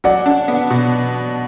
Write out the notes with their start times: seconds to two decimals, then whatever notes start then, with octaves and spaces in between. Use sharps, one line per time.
0.04 F#3 D5 F#5
0.26 D4
0.48 B3
0.70 B2